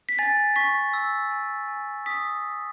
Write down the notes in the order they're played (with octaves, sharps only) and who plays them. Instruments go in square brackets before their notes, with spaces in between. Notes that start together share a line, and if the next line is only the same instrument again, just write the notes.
[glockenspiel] B6
G#5 A6
C#6 B6
E6
G#5
G#5
D#6 B6